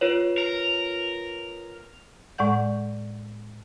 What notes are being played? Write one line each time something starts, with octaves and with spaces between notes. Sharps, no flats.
F4 B4 C#5
A#4
A2 G#3 D5 F#5 G6